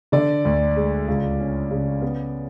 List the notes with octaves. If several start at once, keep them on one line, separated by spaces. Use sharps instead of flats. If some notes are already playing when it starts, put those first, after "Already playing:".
D3 D5
D2
G#3
C#2
C#4
C#3
B3